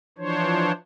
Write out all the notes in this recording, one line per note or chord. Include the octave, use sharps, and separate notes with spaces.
E3 F3 D4 C5 C#5